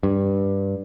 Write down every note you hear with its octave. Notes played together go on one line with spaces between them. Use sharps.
G2